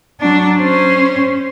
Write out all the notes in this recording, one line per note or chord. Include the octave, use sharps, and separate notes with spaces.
F#3 D4
C#4 C5